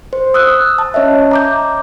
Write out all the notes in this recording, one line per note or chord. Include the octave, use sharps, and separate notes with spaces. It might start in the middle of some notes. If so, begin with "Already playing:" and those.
C5
D#6 E6 F#6
A5
C#4 C#5 D#5 E5
A#5 D6 G6